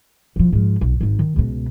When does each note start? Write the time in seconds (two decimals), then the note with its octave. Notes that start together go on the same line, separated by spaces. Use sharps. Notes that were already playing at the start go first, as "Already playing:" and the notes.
0.36 E1 F3
0.53 G#2 F3
0.81 B1
1.01 G#1 D#4
1.19 D#3
1.36 C#2 B2